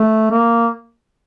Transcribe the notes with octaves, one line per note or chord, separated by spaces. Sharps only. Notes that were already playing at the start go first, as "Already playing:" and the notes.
Already playing: A3
A#3